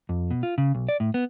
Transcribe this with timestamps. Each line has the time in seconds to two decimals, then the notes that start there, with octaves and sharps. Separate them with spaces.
0.09 F2
0.31 B2
0.43 F4
0.58 C#3
0.75 B1
0.89 D5
1.00 A2
1.14 B3